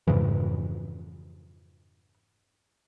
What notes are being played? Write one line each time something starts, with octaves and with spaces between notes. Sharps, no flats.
F2 G#2 C#3 E3